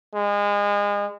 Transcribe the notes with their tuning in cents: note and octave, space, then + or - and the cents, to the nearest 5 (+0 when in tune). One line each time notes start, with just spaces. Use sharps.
G#3 -30